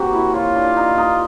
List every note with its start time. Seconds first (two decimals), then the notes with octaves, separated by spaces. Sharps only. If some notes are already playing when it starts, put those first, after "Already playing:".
Already playing: A#3 C4 F#4 G4
0.13 E4
0.34 F4 C#5
0.55 D4
0.76 D#4
0.97 D#4